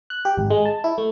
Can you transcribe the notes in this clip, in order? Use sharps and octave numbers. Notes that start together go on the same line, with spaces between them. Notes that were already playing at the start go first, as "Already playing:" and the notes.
F#6
G4
G#1
G#3
A5
E4
A3